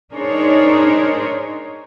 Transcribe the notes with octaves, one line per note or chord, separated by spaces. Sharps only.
D4 D#4 G#4 A#4 C5 C#5